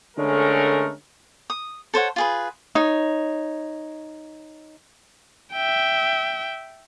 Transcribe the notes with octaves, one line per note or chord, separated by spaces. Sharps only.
D3 G#3 A3 C#4 A#4
D#6
A4 C5 C#5 F#5
F4 G#4 B4
D#4 C#5
E5 G5